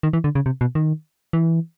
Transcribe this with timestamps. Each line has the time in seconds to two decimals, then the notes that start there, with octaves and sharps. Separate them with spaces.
0.03 D#3
0.13 E3
0.24 D3
0.35 C#3
0.46 C3
0.61 B2
0.75 D#3
1.33 E3